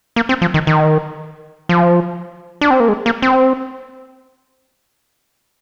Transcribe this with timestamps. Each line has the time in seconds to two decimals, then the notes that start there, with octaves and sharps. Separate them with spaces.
0.16 A#3
0.29 C4
0.42 F3
0.54 D#3
0.67 D#3
1.69 F3
2.61 D4
2.70 C4
2.80 A#3
2.88 G#3
3.06 A#3
3.22 C4